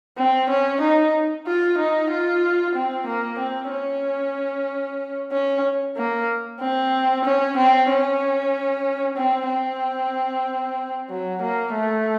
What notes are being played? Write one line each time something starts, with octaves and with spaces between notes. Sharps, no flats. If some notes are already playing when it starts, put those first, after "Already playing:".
C4
C#4
D#4
F4
D#4
F4
C4
A#3
C4
C#4
C#4
A#3
C4
C#4
C4
C#4
C4
C4
F#3
A#3
A3